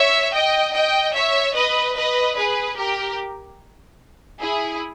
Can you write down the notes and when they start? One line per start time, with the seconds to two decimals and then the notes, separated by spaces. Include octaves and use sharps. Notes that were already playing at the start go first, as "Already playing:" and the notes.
Already playing: C#5 E5
0.33 D#5 G5
0.74 D#5 G5
1.14 C#5 E5
1.55 B4 D#5
1.96 B4 D#5
2.37 G#4 B4
2.77 G4 A#4
4.40 E4 G#4